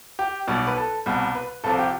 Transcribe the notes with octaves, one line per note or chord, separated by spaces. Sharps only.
G4
B1 B2 G3
B4
A4
C2 B2 G3
B4
C2 C3 F3 A4
G4